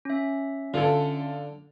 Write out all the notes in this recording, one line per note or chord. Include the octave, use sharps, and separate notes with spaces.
C#4 E5
D3 F4 A4